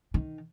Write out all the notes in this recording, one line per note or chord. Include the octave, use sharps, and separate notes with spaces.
D#3